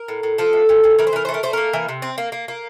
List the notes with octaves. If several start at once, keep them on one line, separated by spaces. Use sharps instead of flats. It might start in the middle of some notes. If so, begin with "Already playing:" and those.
Already playing: A#4
A2
A2
F3 A4
A2
A#2
A#2
E3 A#4
C5
E3 A#4
C5
A3
A#4
A3 C5
A#3 A#4
E3
C3
C4
A#3
A#3
A#3